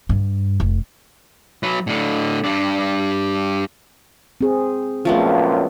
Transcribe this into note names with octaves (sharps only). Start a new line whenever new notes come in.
G2
F1
F#3 B4
A2 D3
G2 D4
C4 G#4
C#2 F#2 A#2 F3 A3 B3